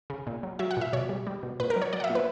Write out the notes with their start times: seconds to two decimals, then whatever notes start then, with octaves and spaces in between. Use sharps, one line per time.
0.10 C#3
0.27 A#2
0.43 F#3
0.59 F#3 E5
0.71 F#5
0.77 A#2 E5
0.93 B2 C#5
1.09 G3
1.27 G3
1.43 B2
1.60 A#2 B4
1.70 A#4
1.76 F#3
1.82 C#5
1.93 F#3 D5
2.00 F#5
2.04 E5
2.10 A#2
2.15 B4